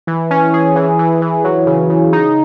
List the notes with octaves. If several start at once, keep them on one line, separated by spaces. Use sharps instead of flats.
E3
C#4
G#4
E3
E3
E3
F#3
C#3
C#3
D#4